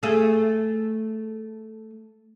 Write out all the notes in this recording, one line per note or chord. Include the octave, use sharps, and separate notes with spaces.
A3 G#4 A4